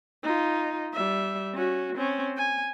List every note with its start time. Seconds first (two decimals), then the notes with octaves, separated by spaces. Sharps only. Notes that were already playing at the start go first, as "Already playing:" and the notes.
0.23 D#4 F4
0.93 G3 E5
1.54 C#4 F#4
1.95 C4 C#4
2.37 G#5